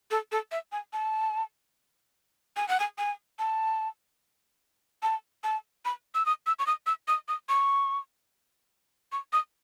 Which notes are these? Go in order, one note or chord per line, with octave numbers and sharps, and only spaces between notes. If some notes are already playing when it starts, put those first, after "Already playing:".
A4
A4
E5
G#5
A5
G#5
F#5
G#5
G#5
A5
A5
A5
B5
E6
D#6
E6
C#6
D#6
E6
D#6
D#6
C#6
C#6
D#6